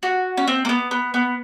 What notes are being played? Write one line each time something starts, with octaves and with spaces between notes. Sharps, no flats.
F#4
C#4
C4
A#3
B3
B3
B3